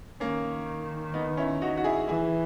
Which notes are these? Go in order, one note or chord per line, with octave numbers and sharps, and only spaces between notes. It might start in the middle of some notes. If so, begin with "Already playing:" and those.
D#3 A#3 C#4
B3 D#4
C#4 E4
D#4 F#4
F#4
E4 G#4
E3 E4 G#4